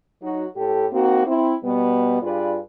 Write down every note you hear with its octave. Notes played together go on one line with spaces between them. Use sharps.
F#3 D#4 F#4
A2 G4 A4
A#3 C4 D#4 F#4
C4 E4
B2 G3 B3
G2 F4 G#4 B4 D5